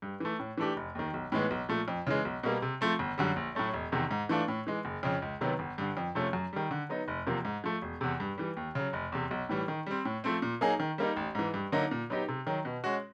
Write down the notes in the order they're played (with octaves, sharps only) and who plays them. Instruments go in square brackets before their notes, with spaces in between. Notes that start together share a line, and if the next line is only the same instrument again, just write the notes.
[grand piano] G2
E3 A3
A2
E3 A3 D4 G4
F1
D#2 D#3
B1
A2 E3 G#3 B3
B1
A#2 F3 A3
F2
C#3 E3 G#3
B1
B2 G3 A#3
C3
F3 A3 C4
G1
F#2 D3 G3
A#1
A2 F#3 A3 C#4
E1
E2 C3 D#3
G#2
E3 A3 D4 F4
A2
E3 G#3
F#1
F2 C#3
C#2
C3 D#3 F#3 B3
G1
G2 D3
F2
C3 F3 A3 C#4
F#2
D#3 G3
D3
F#3 B3 D#4
F1
E2 C3 F3 A#3
G#2
F3 A3
E1
E2 C3
G2
E3 G3
D#2
C#3 F#3
F1
E2 C3
B1
A2 E3 G3
D#3
G3 C4
A2
F3 A3 C4
A#2
F#3 A#3 D#4 G#4
D#3
G3 A#3 D#4
A1
G#2 E3
G2
D3 F#3 A#3 D#4
A#2
F#3 B3 D#4 G4
C3
D#3 F#3
B2
G#3 C#4 F#4